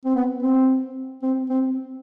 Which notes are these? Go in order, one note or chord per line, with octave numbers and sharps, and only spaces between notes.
C4
B3
C4
C4
C4